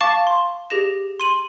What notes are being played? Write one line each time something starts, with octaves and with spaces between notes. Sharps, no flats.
F5 A5 C#6 D6 A6
C6
G4 G#4 A#6 E7
C6 D#7 F#7